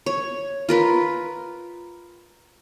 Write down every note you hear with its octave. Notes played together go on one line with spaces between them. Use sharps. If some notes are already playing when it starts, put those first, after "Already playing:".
C#5
F4 A#4 B4